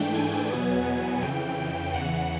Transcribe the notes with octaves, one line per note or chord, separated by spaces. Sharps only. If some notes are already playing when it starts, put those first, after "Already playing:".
Already playing: G#2 E3 A3 D4 G5
G#5
E2 B2 F#3 B3 G#5
F2 C#3 E3 G5
E2 C#3 E3 F#5